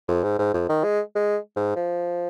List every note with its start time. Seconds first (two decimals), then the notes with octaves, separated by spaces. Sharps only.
0.08 F2
0.23 G#2
0.39 G#2
0.54 F2
0.69 D#3
0.84 G#3
1.15 G#3
1.56 G#2
1.76 F3